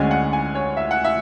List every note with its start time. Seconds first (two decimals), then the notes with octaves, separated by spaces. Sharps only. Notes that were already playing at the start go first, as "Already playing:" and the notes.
Already playing: D2 D3 G#3 C#4 G#5
0.11 F#5
0.33 G#5
0.55 C#5
0.77 E5
0.91 F#5
1.04 E5